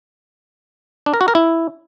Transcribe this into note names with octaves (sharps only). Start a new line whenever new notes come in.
D4
A#4
F#4
A#4
E4